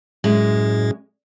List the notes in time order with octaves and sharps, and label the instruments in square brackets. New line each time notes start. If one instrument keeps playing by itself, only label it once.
[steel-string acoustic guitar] F#2 G#3 [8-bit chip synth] A2